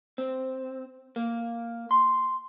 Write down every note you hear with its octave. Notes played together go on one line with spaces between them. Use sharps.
C4
A#3
C6